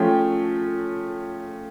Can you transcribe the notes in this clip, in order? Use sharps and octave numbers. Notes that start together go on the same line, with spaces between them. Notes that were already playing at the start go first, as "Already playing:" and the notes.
Already playing: F3 A3 C#4 G5